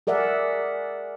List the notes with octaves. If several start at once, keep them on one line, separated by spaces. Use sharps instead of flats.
G#4 A#4 D5 E5 F#5